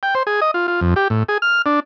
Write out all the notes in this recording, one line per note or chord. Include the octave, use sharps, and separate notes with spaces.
G5
C5
G#4
D#5
F4
F4
F2
G4
A2
G#4
F6
D4